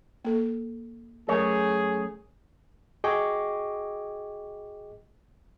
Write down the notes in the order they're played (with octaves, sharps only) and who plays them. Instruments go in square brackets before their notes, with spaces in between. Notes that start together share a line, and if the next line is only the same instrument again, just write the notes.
[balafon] A#3 A4
[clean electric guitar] F#2 A3 C#5 [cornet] G#4 [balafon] A#4
[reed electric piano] F#4 G#4 D#5 G5 C#6 D6